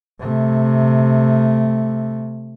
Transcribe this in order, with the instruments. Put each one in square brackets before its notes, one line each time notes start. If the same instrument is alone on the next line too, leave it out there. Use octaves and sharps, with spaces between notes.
[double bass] C3 A3